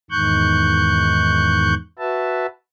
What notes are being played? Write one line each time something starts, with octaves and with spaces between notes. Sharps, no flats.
E2 G#2 D#3 C#6 F#6 G6
F#4 B4 E5 A5